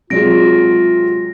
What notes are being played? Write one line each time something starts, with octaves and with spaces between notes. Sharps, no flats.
C3 F#3 G#3 F4 A#6 D7